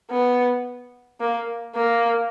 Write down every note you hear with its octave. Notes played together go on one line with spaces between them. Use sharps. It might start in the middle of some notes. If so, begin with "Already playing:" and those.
B3
A#3
A#3